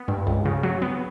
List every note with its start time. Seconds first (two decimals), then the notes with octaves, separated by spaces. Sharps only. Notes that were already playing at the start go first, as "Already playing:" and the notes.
Already playing: B3
0.08 G2
0.27 C#2
0.45 C#3
0.63 F#3
0.82 B3